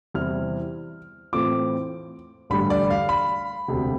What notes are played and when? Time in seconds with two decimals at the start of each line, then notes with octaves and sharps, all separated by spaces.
0.14 E2 C3 G3 C4 E4 F6
1.33 A2 E3 A3 C4 F4 D6
2.50 A1 G2 D3 G3 B5
2.70 D5
2.90 F5
3.09 B5
3.68 E1 D2 C3